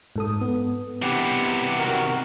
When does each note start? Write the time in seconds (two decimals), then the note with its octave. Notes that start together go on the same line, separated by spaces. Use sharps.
0.16 G#2 A4 D#6
0.41 B3
1.02 C3 E3 G4 F#5
1.79 D#3 F#4 A#4